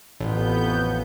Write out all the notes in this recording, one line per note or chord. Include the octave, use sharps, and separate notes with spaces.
A1 F2 B3 G6